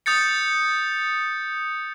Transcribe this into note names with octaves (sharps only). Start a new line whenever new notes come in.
D#6 G6 A6 C#7